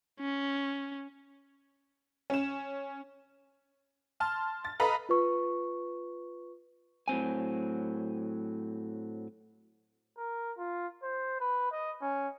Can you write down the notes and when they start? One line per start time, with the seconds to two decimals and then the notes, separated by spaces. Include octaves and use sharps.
0.20 C#4
2.30 C#4 E7
4.20 A5 C6 F6
4.65 A6
4.80 A4 B4 D#5 F5 A#5 B5
5.09 F4 B4 C#6
7.08 A2 F#3 C4 G#5
10.18 A#4
10.58 F4
11.03 C5
11.40 B4
11.72 D#5
12.02 C#4